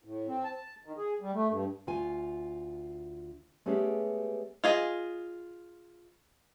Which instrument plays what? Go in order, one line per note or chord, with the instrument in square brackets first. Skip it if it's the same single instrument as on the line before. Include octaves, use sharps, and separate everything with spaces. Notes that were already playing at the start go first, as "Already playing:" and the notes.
[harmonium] A2
C4
A5
D#3
G#4
G3
A3
G2
[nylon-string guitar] D2 F4 G#5
G#3 A3 B3 C#4 G4 G#4
[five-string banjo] F4 G#4 D#5